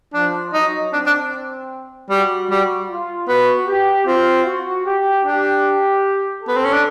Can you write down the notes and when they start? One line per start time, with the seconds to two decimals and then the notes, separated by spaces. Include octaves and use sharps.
0.14 F3 D4
0.54 F#3 D#4
0.93 C4 D4
1.06 D4
2.10 G3 F#4
2.50 G3
2.89 F4
3.28 B3 F#4
3.68 G4
4.07 C4 F4
4.46 F#4
4.86 G4
5.24 D4 G4
6.43 A4
6.48 B3
6.56 C4
6.65 C#4
6.73 D4